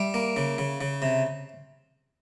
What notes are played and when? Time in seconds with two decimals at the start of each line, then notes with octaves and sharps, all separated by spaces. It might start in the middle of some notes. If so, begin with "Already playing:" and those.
Already playing: G3 E5
0.14 A#3
0.37 C#3
0.58 C#3
0.81 C#3
1.02 C3